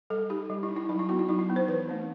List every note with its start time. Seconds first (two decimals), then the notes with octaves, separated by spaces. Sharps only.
0.10 G3 A4
0.30 D#4 G4
0.50 G3
0.63 E4
0.69 D#4
0.76 E4
0.89 F#3 D#4
0.99 E4
1.09 B3 D#4 F#4
1.19 E4
1.29 F#3 D#4
1.39 E4
1.49 B3 D#4
1.56 C5
1.68 E3 B4
1.88 A3 C4 D#4